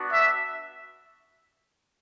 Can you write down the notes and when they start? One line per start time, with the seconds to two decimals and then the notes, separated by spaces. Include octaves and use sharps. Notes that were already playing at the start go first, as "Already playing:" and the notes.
Already playing: B3 D4 F#4
0.12 E5